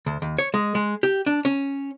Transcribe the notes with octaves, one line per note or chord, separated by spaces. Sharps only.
D2
D#2
C#5
G#3
G#3
G4
D4
C#4